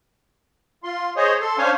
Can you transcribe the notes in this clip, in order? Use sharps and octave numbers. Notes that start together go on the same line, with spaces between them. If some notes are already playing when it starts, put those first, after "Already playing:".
F4 C6
G#4 C5 C#5 D#5
A4 C6
C#4 D4 C5 C#5 F5 G#5